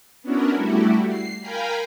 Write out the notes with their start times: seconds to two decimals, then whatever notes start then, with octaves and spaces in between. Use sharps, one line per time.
0.22 B3 C#4 D4 E4 F#4 A#4
0.54 G3 A3 E4 F#4 G4
1.07 C7
1.41 A#4 F5 G5 G#5 A#5 B5